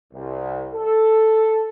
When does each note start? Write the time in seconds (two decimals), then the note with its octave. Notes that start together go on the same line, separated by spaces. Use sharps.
0.13 C2
0.74 A4